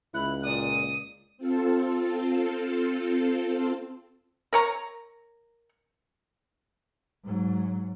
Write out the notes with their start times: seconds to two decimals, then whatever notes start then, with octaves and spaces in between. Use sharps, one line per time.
0.14 C#2 E4 F#6
0.44 A#2 D5 D#6
1.38 C4 F4 A4
4.53 A#4 C#5 A#5
7.25 G#2 F#3